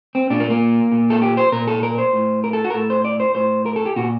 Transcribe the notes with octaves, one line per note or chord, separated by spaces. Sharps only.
C4
A#2 D4
A#3
A#3
A#2
A4
G4
C5
A#2 A#4
A4
A#4
C5
A2
A#4
A4
F#4
A#4
A2 A4
C5
D5
C5
A2 C5
A#4
A4
G4
A#2 F#4